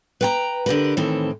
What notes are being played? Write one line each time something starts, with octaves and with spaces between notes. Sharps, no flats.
B4 G5 A#5
D3 G4 A#4 B4
A2 D#3 E3 C4 A4